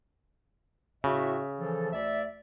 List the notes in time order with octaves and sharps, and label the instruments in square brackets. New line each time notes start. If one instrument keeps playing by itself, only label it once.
[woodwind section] A2 F#4 E5 [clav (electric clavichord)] C#3
[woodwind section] E3 F3 A4
D2 D5 E5